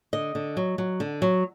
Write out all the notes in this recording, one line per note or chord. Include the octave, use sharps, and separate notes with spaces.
D3 D#5
D3
F#3
F#3
D3
F#3